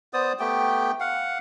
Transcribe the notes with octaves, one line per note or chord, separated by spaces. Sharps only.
B3 C5 D5 D#6
A3 B3 G4 G5
F5 F#5